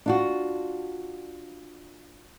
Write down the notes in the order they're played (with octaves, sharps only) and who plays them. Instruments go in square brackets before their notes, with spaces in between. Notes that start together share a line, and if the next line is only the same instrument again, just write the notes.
[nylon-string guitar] D4 F4 F#4